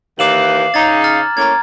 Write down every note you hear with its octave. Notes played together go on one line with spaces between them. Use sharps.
D#2 E3 F5 D6 E7 F#7
C#3 D#4 A#5 G#6 A6
F6 A6
A2 A#3 C#4 A#5 G#6